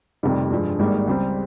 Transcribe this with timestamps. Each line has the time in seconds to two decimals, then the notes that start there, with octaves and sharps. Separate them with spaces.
0.23 F1 F2 C3 D#3 G3
0.51 G2 F3 G#3
0.79 G#1 G#2 G3 A#3 D#4
1.08 C#2 C#3 G3 C4